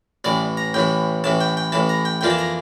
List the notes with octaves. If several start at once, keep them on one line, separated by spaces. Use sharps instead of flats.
A1 A2 E3 D5
A#5
A1 A2 E3 G5
A1 A2 E3 A5
G5
G5
A1 A2 E3 A5
A#5
G5
F2 E3 A#3 D4 F4 G5
A5
A#5